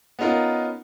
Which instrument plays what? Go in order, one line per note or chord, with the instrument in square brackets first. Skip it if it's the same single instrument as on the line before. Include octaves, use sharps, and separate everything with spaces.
[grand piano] B3 C#4 D#4 F4 A#4